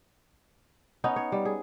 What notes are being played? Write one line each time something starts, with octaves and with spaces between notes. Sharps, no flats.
B3 C#4 D#4
C#5
G3
G#4